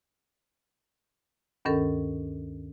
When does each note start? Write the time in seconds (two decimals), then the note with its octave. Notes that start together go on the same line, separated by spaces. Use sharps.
1.65 D2 G2 D#3 C#4 A4 A#4